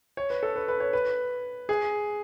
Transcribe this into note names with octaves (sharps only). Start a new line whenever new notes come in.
C#5
B4
A4
B4
B4
C#5
B4
G#4